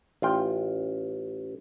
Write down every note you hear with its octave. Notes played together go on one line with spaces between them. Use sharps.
A1 F4 G5